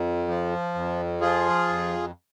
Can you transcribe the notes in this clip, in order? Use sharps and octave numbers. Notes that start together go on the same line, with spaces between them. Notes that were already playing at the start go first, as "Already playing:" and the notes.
Already playing: F2
F3
F2
F3 F4 G#4
F2